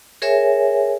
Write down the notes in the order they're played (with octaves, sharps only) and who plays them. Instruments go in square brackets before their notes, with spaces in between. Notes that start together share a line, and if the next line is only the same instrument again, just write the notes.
[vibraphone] G#4 A#4 C#5 E5 G#5